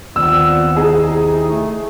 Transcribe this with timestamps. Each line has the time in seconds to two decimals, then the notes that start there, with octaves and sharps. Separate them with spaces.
0.16 D#2 D#3 B3 C4 F4 D5 E6
0.76 C3 D#4 E4 G#4
1.48 A3